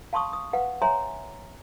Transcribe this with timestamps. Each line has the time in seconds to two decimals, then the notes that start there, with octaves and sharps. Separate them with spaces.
0.13 F5 A5 C6 C#6 D#6
0.33 D#6
0.53 B4 F5 F#5
0.82 C#5 E5 G#5 A#5 C6